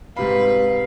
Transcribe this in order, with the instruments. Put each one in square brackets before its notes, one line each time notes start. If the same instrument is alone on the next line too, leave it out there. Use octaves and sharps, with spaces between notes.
[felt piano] G#2 C3 B5 [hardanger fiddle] B4 [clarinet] F5